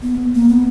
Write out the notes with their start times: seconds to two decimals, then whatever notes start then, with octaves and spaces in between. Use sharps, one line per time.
0.02 B3
0.35 A#3
0.49 B3